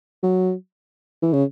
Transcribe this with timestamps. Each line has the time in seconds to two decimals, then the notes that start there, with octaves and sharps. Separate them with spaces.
0.23 F#3
1.22 E3
1.33 C#3